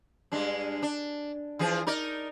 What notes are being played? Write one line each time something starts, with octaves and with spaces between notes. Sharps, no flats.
G2 G#3 D4
D4
E3 F3 G#4
D#4 A#4 D5